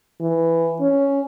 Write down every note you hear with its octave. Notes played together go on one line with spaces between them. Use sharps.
E3
C#4